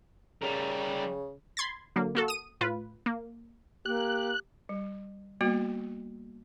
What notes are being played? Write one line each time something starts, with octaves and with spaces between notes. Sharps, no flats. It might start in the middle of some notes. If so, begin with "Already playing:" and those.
C#3 G3 A#4
B5 C6 G#6 A6
D3 F#3 A#3
A#3 F#4 A4
D#6 D#7
A2 F4 B4
A#3
A#3 G4 F#6
G3
G3 A#3 B3 F#4